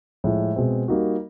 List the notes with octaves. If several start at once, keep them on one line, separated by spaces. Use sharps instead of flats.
A2 F3 G#3
B2 G#3 C4
G3 A#3 D#4 F#4